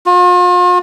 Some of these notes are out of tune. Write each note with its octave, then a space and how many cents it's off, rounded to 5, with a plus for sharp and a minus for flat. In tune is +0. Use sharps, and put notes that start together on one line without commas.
F4 +40